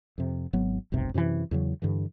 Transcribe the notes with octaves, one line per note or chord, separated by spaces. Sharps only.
F2 C3
G#1 F#3 B3
F1 B1 G2 C3
F#2 C3 D#3 E3
E2 C#3 F#3
G2 D3 E3